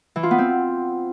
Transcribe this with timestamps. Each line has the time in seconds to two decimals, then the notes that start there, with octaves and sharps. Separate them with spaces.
0.16 E3
0.23 F4
0.31 B3
0.38 C4